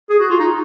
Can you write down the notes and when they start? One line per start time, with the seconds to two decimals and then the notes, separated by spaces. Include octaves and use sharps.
0.10 G#4
0.20 F#4
0.30 F4
0.39 D#4